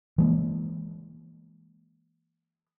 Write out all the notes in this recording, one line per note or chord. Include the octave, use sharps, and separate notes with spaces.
E3 G#3 A#3